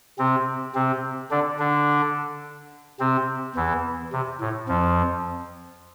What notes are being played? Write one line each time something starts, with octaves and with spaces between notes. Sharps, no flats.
C3 C4
C3 C4
D3 D4
D3 D4
C3 C4
E2 E3
C3
A2
F2 F3